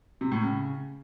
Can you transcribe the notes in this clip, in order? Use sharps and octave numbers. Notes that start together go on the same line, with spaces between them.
C3
A2
C#3